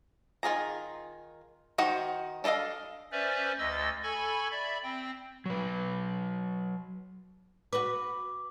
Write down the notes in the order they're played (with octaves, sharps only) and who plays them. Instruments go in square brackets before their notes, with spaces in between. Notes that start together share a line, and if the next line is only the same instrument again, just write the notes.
[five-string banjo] D#3 F4 G#4 A#5
D#3 D#4 F#4 C5 F#5
D4 A4 B4 D#5 F5
[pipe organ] C#4 B4 C5 D5 E5
D2 D#5 E6 A6
A4 G#5 B5 C#6 G#6
D5 E5 B5
C4 G5
[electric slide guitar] F#3 B4
[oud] F#4 B4 [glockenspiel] D6